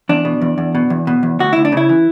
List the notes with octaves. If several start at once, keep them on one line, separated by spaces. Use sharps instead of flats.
E2 D4
B2
E2
E2
B2
E2
B2
E2
D2 F#4
D2 E4
D4
C#3 E4
E3